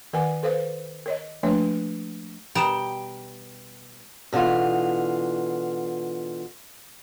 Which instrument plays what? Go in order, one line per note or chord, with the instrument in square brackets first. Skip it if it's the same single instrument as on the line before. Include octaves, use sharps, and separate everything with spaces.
[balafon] D#3 A#4 B4 F#5 G#5
A4 B4 C5 F5
A#4 C#5 D#5
F3 A3 A#3 D4 B4 C#5
[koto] B2 G3 [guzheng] G5 [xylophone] A#5 D#6 E7
[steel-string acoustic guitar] B2 D3 E3 F4